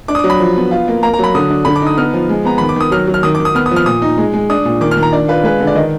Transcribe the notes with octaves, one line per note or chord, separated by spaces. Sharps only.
D4 D6
D#6
D6
F#3
B5
F3
B3
F4
A#3
A#3 A#5
A#5
F#3 B5
D3 D#6
D4
D3 B5
D6
D#4 D#6
B3 F6
F3
G#3
B3 A#5
D#3 B5
D6
D#3 D#6
F#3 F6
F#3
F6
D#3 D#6
D6
D#3
D#6
B3 F6
D#6
F3
F6
A#2 D#6
D#4
G#3
G#3
D4 D#6
A#2
D#3 D6
F6
D#3
A#5
D4 D5
F4 B4
G#3 B4
D3
D5
D#3 D#5